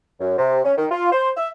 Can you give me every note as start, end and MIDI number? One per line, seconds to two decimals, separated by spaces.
0.20 0.36 42
0.38 0.59 48
0.64 0.72 61
0.77 0.86 51
0.91 1.11 65
1.12 1.30 72
1.37 1.49 76